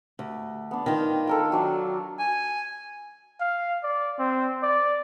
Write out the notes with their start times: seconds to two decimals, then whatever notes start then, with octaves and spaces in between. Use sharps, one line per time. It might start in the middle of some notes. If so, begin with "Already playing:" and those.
0.19 D2
0.71 B3 D4
0.86 D#3 F4 G5
1.27 A4 A#4 G5
1.52 F#3 D4 F5
2.19 G#5
3.40 F5
3.83 D5
4.19 C4
4.63 D5